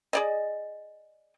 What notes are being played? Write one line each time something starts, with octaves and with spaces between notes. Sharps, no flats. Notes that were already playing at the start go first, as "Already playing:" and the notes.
G#4 D5 D#5